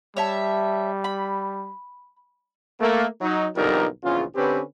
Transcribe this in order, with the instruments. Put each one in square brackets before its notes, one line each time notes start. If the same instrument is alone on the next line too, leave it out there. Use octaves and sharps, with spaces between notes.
[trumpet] G3 [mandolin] C#5 E5 A5
[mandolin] B5
[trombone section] A3 A#3
F#3 D#4
B1 F2 D3 G3 D#4 A#4
A#1 E2 C#3 C#4 F4
D3 C4 C#4 G4 B4